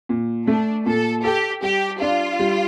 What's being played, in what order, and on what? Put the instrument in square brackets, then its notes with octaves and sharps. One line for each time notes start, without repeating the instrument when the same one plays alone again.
[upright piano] A#2
[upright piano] A3 [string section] D4
[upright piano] A#2 [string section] A4
[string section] G4 [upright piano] A4
[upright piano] G3 [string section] G4
[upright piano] D4 [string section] F4
[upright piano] G3